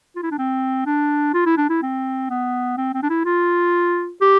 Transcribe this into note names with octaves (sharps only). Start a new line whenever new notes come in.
F4
E4
D4
C4
D4
F4
E4
D4
E4
C4
B3
C4
C4
D4
E4
F4
G4